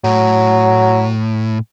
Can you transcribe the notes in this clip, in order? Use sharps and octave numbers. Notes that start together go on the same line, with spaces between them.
A2 F#3